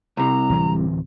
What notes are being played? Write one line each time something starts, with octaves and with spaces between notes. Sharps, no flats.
C2 C3 A#5
D1 E3 C4